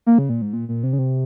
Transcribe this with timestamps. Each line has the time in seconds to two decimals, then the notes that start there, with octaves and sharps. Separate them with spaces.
0.07 A#3
0.19 C#3
0.29 A#2
0.42 G#2
0.53 A#2
0.69 A#2
0.83 C3
0.93 C#3
0.99 C3